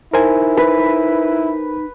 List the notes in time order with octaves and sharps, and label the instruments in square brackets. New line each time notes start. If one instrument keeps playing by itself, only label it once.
[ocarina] D#4 [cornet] E4 [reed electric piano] A#4 C5 G#5
[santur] B4